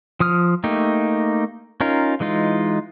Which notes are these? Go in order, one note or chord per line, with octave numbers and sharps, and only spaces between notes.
F3 D#6 F6
A3 A#3 D#4 G4
C#4 D#4 F4 A#4
E3 G#3 D#4 F4